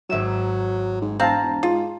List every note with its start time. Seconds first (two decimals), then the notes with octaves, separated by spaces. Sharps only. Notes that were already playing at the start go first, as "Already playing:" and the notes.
0.10 G#1 F#3 E5 E7
1.02 G#2
1.20 E1 C4 F5 A5 A#5
1.41 E1
1.63 G#2 F4